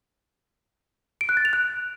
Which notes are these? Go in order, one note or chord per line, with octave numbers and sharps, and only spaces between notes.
D7
F#6
A6
F7
F#6